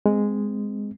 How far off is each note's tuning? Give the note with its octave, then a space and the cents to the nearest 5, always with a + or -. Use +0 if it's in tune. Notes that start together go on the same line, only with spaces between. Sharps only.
G#3 -5 C4 -25